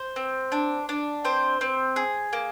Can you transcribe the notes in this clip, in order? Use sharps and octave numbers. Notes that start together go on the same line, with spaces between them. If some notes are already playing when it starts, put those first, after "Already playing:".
Already playing: C5
C4
D4
D4
C4 C5
C4
G#4
A#3